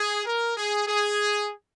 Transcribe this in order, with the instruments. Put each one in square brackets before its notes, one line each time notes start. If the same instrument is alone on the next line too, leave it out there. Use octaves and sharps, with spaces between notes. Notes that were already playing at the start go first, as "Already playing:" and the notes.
Already playing: [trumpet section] G#4
A#4
G#4
G#4